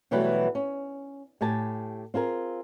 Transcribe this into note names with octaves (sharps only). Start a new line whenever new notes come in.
B2 E3 F#3 G3 A3 B4
C#4
A2 G4 G#5 A5
C4 F4 G#4 A#4